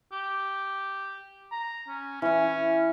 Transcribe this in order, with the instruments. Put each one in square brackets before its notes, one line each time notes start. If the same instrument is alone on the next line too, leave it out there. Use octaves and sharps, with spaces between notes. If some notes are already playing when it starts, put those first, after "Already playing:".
[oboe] G4
A#5
C#4
[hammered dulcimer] E3 E4 [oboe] C#4